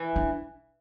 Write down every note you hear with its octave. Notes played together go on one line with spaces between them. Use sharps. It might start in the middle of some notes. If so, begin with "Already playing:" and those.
Already playing: E3
D4